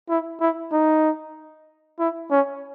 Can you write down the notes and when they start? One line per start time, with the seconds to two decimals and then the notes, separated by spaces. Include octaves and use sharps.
0.09 E4
0.41 E4
0.72 D#4
1.99 E4
2.31 C#4